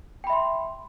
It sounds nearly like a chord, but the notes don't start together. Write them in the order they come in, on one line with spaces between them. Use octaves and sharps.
G5 B5 E5 C6